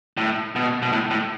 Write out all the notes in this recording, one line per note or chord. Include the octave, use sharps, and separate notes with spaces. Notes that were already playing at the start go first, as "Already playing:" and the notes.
A2
B2
B2
A2
A2